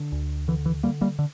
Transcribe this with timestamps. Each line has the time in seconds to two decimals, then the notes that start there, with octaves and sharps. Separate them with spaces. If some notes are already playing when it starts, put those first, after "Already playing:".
Already playing: D3
0.12 D2
0.48 D3 E3
0.66 E3
0.83 D3 G3 A#3
1.01 G3 A#3
1.19 D3